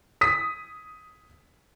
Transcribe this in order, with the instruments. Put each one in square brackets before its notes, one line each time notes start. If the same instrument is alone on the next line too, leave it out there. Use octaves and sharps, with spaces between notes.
[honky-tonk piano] D#6 B6